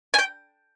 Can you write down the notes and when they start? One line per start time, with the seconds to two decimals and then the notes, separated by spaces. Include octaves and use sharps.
0.14 G#5
0.18 G5